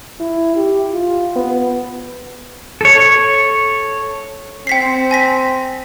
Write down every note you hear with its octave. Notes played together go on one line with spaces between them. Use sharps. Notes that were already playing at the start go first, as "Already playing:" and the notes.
E4
G4
F4
B3
A4 C#5
C4 G5 B6 C7
G#5 A#6 B6